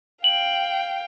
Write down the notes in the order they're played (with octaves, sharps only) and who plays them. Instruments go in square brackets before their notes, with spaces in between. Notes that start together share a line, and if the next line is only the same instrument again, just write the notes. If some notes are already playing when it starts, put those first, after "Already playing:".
[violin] F5 G5 [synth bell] F#7